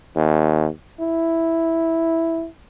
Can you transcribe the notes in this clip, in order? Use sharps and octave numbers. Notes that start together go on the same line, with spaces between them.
D#2
E4